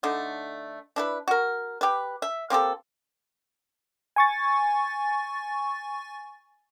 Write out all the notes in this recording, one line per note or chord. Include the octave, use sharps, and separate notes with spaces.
D3 A3 D#4
D4 E4 B4
F#4 A#4
G4 B4
E5
A#3 C4 G4 A4
G#5 C#6 A6